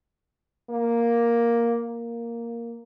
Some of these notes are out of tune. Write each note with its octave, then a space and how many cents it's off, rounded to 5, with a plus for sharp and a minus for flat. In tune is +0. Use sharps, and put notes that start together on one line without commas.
A#3 +5
A#3 +0